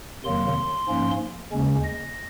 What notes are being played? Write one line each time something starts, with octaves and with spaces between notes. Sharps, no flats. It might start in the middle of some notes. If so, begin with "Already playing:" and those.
F2 C3 D#3 F#3 A#3 C6
G#2 F3 A#3 C#4
D#2 C#3 G#3 C#4
D#5